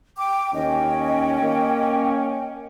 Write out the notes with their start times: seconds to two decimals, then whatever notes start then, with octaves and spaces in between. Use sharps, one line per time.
0.16 G5 D6
0.54 D#2 C#4 D#5 G5
1.42 A#3